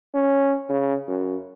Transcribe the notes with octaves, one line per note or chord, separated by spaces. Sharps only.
C#4
C#3
F#2